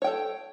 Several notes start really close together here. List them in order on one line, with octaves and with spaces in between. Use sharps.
C#5 G5 A4